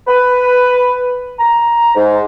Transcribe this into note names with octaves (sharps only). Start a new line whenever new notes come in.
B4
A#5
G#2